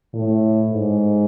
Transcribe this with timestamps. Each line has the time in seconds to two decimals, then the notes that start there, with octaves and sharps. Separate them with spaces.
0.14 A2
0.70 G#2